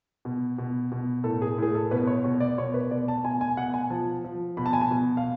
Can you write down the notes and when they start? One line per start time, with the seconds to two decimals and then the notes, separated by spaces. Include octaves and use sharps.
0.25 B2
0.58 B2
0.92 B2
1.24 A2 A4
1.42 G#4
1.58 A2 G#4
1.75 A4
1.91 B2 B4
2.07 C#5
2.24 B2 C#5
2.40 D5
2.58 B2 C#5
2.74 B4
2.91 B2 D5
3.08 A5
3.24 B2 G#5
3.41 G#5
3.57 B2 F#5
3.74 G#5
3.90 F3 A5
4.24 F3
4.57 B2 B5
4.66 A5
4.73 G#5
4.81 A5
4.91 B2
5.17 F5